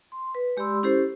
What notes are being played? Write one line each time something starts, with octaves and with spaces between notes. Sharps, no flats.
C6
B4
G#3 G4 D5 B5 C6 E6
C#4 E4 G4 A4 C5